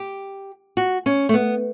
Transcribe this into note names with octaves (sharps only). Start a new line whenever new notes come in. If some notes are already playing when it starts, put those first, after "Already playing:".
Already playing: G4
F#4
C#4
A3
B3